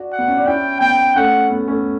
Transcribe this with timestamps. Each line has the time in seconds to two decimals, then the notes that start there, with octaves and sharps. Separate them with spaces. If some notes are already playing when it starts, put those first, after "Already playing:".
Already playing: D4 F#4
0.12 F#5
0.19 B3
0.28 C#4
0.37 D4
0.46 C#4 E4 G5
0.81 B3 G5
1.16 A3 C#4 F#5
1.50 B3
1.68 A3 C#4